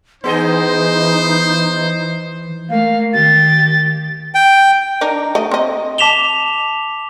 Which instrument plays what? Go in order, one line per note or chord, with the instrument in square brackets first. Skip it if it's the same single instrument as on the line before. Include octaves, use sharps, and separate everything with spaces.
[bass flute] E3 [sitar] B3 G#4 D#5 [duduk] D#4 [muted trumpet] C5
[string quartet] A3 A#3 [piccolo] F5
[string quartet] D#3 G4 [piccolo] A6
[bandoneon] G5
[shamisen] D4 D#4 A#4
A3 D#5
C4 D#5
[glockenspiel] A5 D6 B6 E7 F7 G7